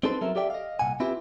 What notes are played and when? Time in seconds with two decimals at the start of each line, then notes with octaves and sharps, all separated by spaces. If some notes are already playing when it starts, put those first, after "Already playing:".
0.03 C4 D#4 G#4 A4 B4 C5
0.21 F#3 C4 A#4 E5
0.36 G4 A4 D5 E5 G5
0.50 D#5 F5
0.79 C2 A#2 F#5 G#5
1.00 C4 E4 F4 G4 B4